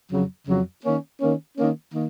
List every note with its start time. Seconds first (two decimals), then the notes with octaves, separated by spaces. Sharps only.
0.11 F2 C#3 F#3
0.47 F2 C#3 F#3
0.84 D#3 A#3 C#4
1.19 D#3 A#3 C#4
1.57 D#3 A#3 C#4
1.93 D#3 A#3